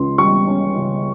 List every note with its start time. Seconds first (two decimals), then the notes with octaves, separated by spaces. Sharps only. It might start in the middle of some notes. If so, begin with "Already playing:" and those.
Already playing: C#2 C#3 C6
0.18 G3 C#6
0.47 C#4
0.76 C#3